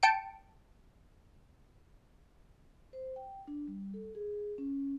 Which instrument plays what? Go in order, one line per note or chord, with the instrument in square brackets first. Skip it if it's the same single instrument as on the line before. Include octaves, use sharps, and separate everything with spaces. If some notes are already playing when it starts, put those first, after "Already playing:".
[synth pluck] G5 A5 C#7 D7
[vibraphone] C5
G5
D4
G3
A4
G#4
C#4